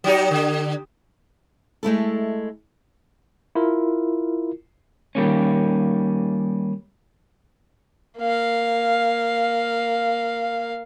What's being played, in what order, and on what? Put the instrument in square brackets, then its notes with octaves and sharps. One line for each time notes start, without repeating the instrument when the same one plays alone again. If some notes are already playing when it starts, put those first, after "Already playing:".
[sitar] F#3 D#4 G4
D3
[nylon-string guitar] G#3 A3 E4 A4
[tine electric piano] E4 F4 A#4
[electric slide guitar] D#3 G3 A#3 C#4
[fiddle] A#3 F5